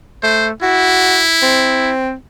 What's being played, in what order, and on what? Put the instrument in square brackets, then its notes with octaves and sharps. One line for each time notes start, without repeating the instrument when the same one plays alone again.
[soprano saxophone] A3 [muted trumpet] C5
[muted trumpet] E4 [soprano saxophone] F#4
[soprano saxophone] C4